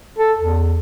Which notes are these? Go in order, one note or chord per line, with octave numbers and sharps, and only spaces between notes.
A4
E2